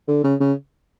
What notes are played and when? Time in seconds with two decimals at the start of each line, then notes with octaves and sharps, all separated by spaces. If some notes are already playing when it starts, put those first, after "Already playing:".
0.08 D3
0.24 C#3
0.40 C#3